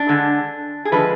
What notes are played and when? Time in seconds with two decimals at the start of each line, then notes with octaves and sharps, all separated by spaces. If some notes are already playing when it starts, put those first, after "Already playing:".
Already playing: D4
0.09 D3 G#3
0.85 G#4
0.92 D3 F3 G#3 B4